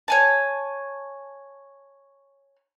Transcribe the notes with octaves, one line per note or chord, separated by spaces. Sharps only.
C#5 G#5 A5